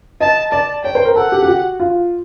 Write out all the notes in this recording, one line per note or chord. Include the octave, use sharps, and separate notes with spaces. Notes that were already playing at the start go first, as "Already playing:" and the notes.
D#5 A5
D5 A5
C#5 G5
C5
A#4
A4 F#5
G4
G4
F#4
F4